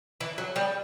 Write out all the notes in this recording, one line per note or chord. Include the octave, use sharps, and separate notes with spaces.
E3
F#3
G3 B3